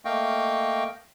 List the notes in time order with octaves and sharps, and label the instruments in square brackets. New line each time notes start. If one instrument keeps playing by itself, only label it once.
[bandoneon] A3 A#3 D#5 F5 G5 C#6